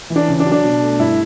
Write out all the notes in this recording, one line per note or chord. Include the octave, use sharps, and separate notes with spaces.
E3
D4
C#3
D4
F#3
D4
B2
A3
G2 E4